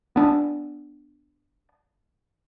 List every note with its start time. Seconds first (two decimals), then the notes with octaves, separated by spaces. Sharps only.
0.16 B3 D4